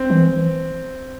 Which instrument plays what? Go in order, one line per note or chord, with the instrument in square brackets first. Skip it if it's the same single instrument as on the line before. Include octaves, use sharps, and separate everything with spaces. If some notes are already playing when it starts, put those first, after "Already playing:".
Already playing: [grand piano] C4
[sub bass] E3